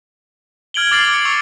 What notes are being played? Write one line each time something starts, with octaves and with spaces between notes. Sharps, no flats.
F6 G#6 D7 F#7 G7
D6 F6 A6 C7 D7 F#7
E6 C#7
C#6 E6 F7 F#7